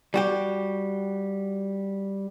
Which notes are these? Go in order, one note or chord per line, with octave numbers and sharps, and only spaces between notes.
G3 F#4 G4